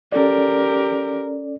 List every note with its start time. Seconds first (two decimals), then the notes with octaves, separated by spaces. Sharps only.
0.12 C#4 G4 A4 A#4 D5